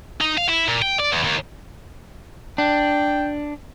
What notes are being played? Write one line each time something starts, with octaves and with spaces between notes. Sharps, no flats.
D#4
F5
E4
A#2
G5
D5
E2
D#2
D4 G5